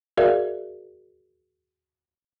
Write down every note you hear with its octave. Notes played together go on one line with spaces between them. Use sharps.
F#4 G#4 A#4 D5 E5 F5